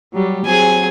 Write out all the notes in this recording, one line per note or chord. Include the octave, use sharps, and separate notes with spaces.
F#3 G3 G4
F#3 C4 G#4 G#5